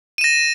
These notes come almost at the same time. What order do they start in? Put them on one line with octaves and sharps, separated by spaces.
D#7 E7 A#6